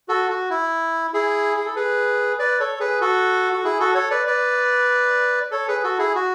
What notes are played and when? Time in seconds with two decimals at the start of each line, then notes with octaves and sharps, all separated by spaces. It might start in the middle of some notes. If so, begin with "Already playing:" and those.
0.08 F#4 A4
0.30 F#4
0.50 E4
1.14 E4 G#4
1.56 G#4
1.66 A4
1.76 G#4 B4
2.39 B4 D5
2.60 A4 C#5
2.80 G#4 B4
3.01 F#4 A4
3.53 F#4
3.64 E4 G#4
3.80 F#4 A4
3.95 A4 C#5
4.10 B4 D5
4.27 B4 D5
5.51 A4 C#5
5.68 G#4 B4
5.83 F#4 A4
5.98 E4 G#4
6.15 F#4